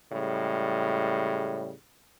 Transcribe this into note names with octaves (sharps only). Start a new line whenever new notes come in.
A2 C#3 G3 G#3